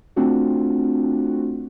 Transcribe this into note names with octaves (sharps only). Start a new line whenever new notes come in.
A3 C4 D4 F4 F#4